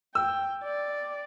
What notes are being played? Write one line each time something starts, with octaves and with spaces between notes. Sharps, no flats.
G5 E6
D5